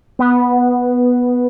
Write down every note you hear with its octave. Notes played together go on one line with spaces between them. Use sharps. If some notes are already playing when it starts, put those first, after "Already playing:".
B3